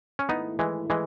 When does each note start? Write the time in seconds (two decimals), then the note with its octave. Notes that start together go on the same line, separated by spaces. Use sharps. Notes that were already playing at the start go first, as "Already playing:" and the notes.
0.19 C#4
0.29 G#2 D#3 A3 B3 D#4 E4
0.59 E3 G#3
0.90 E3 G#3